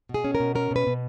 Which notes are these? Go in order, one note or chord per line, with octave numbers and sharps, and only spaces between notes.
B2
G#4
C#4
A#4
B2
C#4 A#4
B2 B4
B2